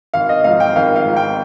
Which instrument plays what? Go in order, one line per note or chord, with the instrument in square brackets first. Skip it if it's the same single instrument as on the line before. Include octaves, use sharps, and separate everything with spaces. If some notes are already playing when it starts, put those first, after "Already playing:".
[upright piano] G#1 F5
D#5
G#2 F3 F5
G5
G#1 F5
F5
G#2 F3
G5